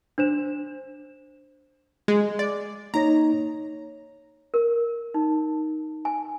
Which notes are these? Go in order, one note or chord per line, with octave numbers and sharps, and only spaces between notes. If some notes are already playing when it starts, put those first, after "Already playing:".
D4 C5 E7
G#3
D5
A#3 D#4 C#5 A#5
A#4
D#4
G#5